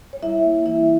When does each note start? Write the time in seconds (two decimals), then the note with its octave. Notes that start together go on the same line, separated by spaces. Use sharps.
0.13 C#5
0.22 G3 E4 E5
0.44 A#3
0.66 E3 E4 E5